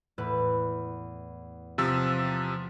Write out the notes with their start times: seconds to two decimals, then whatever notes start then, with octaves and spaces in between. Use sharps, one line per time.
0.18 E2 A2 B4
1.78 C3 F3 E6